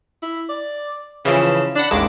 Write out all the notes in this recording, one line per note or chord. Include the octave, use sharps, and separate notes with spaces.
E4
D5
C#3 E3 F3 E7
D4 F#5 B5 E7
A1 D#2 G#3 D6